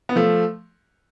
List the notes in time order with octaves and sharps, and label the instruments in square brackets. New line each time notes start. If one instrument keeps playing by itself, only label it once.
[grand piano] B3
F3 A3